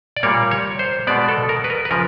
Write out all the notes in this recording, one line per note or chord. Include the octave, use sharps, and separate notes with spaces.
D5
A#2 G3 A#3 C#5
C#5
C5
B2 G#3 B3 D5
A4
A#4
B4
A#4
B4
C#3 F3 A#4